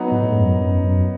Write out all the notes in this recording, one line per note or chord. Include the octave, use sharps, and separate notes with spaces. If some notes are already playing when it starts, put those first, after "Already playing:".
Already playing: F#3 B3 D#4
A2
G#2
F#2
F#2
F#2